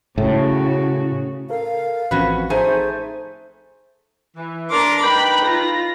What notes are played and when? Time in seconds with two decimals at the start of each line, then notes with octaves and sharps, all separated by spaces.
0.18 A2 C#3 F#4
1.50 A4 A#4 F5
2.11 A1 F3 C4 C#4 F#4 B4
2.50 A3 D#4 G#4 C5 G#5
4.37 E3
4.71 D4 A#4 A#5 C6 D6
5.03 D#4 B4 G5 B5
5.44 F4 A#6